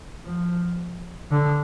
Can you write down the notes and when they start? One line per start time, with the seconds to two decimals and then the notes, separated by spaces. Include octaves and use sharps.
0.25 F3
1.31 D3